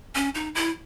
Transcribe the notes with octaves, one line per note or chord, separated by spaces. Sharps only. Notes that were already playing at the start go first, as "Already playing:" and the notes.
C#4
D#4
E4